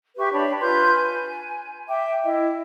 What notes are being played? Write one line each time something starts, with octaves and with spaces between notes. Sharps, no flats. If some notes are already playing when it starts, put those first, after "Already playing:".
G4 B4 E5 C#6
D4 C#5 A5 B5
F4 B4 C6 G6
G#5
E5 G5 D6
E4 D#5